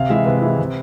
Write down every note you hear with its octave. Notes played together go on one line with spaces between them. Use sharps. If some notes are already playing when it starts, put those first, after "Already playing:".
Already playing: C3 F5
E3 G#3 E5
C3 B4
E3 G#3
C3